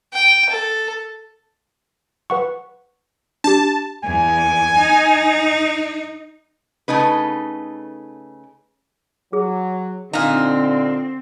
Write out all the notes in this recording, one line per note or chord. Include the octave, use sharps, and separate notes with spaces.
G5
A4
B4 F#5 C#6
D4 G4 A5
E2 G#5
D#4
C#3 A3 D#4 B4
F#3 G#4
A#2 D3 C4 D#4 F5 A#5